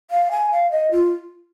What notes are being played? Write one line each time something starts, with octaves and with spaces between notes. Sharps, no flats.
F5
G#5
F5
D#5
F4